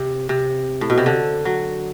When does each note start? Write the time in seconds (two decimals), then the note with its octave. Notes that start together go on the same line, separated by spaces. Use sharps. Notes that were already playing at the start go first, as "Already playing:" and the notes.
Already playing: C3
0.29 C3
0.81 A2
0.90 B2
0.98 C3
1.06 D3
1.45 F#3